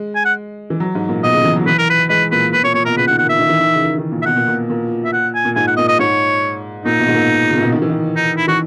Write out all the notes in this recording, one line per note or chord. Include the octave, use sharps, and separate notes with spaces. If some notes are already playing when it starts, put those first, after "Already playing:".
Already playing: G#3
G#5
F#5
E3
F#3
G#2
A#2
B2 D#5
C#3
E3
F#3
E3 B4
A#4
B4
G#3 B4
A#2 B4
A#2 B4
A#2 C#5
A#2 C#5
B2 A#4
C#3 B4
F#5
D#3
F#5
A#2 E5
D#3
E3
D#3
C#3
D#3
D#3
A#2
E5
B2 F#5
A#2
A#2
A#2
E5
F#5
G#5
A#2
G#2 G#5
F#5
A#2 D#5
D#5
G#2 C#5
A#2 D#4
B2
G#2
A#2
C#3
A#2
B2
D#3
E3
D#3
D#4
E4
E3 F#4